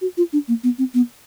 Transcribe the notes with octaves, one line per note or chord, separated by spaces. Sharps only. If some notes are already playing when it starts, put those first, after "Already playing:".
F#4
F4
D4
A#3
B3
C4
B3